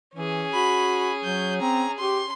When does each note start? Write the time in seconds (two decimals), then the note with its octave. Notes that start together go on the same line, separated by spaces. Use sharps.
0.15 E3 C#4 G#4
0.54 F#4 B5
1.25 F#3 G6
1.62 C4 A#5
1.99 C#4 G4 C6